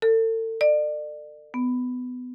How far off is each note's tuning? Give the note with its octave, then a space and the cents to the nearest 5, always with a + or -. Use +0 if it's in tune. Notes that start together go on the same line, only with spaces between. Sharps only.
A4 +35
D5 +35
B3 +20